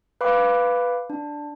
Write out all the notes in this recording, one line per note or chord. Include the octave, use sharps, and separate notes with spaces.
B4 F5 B5 D6
D4